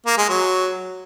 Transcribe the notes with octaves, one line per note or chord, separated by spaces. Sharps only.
A#3
G#3
F#3